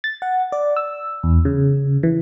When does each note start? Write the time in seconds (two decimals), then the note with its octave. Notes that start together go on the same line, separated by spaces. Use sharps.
0.04 A6
0.22 F#5
0.52 D5
0.76 E6
1.23 E2
1.45 C#3
2.03 E3